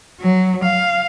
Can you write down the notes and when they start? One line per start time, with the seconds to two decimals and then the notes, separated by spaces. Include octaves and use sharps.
0.20 F#3
0.64 F5